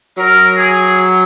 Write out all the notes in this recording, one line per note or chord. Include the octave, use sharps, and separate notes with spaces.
F#3 A#4
G#4